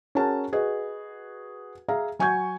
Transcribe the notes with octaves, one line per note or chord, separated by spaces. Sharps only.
C#4 F#4 G#4 A#4 A5
F#4 G#4 B4 D#5
G#4 E5 F5 A#5
F#3 G#5 C#6 G6 G#6